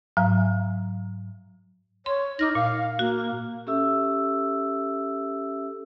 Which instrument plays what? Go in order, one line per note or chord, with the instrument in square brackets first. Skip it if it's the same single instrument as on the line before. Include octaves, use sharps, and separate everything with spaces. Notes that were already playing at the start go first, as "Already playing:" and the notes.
[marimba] G#2 F#3 F5 A#5
[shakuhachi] C#5 [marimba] C6
[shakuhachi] D#4 [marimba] D6 F6 A#6
[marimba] A#2 [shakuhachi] F5
[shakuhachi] A#3 [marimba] F#4
[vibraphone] C#4 G4 A4 E5 E6